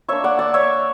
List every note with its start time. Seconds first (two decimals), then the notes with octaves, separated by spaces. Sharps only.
0.08 A#3 D4 C#5 E5
0.24 D5 F#5
0.39 D5 F#5
0.54 C#5 E5